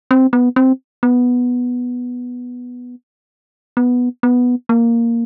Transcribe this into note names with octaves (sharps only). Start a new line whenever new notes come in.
C4
B3
C4
B3
B3
B3
A#3